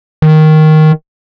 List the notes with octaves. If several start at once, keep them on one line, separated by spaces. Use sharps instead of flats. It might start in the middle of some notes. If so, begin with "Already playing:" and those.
D#3